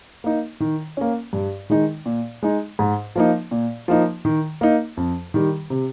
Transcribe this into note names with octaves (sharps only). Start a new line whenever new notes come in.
A#3 D#4
D#3
A#3 C#4
G2
D#3 G#3 D#4
A#2
G#3 D#4
G#2
F3 A#3 D#4
A#2
F3 A#3 D#4
D#3
A#3 D#4
F2
D#3 G3
C3